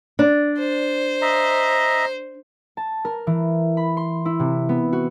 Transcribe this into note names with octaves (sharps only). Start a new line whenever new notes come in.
D4
C5
D#5 E5 A#5
A5
A#4
E3
B5
C6
E4
C3
B3
F#4